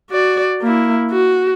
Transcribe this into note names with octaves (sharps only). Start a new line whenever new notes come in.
F#4 D5
A#3 E4
F#4